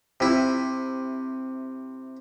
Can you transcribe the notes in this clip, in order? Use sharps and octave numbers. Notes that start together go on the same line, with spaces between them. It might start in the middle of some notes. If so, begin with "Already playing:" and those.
C3 E4